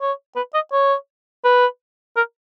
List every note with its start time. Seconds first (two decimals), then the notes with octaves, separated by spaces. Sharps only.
0.01 C#5
0.36 B4
0.54 D#5
0.72 C#5
1.44 B4
2.16 A#4